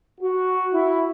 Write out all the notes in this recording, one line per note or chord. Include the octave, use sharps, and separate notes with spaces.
F#4
E4